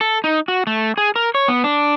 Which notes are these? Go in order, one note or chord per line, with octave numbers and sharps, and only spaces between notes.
A4
D#4
F#4
A3
G#4
A#4
C#5
B3
D4